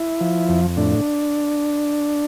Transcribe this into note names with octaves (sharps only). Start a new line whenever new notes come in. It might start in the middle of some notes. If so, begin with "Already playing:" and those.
Already playing: E4
F3
F2
A2 D4